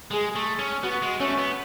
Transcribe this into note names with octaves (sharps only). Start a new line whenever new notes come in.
G#3 G#4
A3
C#4
B3 F#4
G#3
A3 C#4
B3